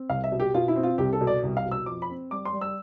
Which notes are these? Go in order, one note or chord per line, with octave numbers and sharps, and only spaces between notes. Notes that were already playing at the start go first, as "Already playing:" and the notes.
Already playing: C4
C2 F5
E5
B2
G4
B2 F4
E4
C4
F4
C2 G4
A4
B2
D5
C2
F5
B2
E6
F2 D6
B5
C4
G3 D6
C6
G3
E6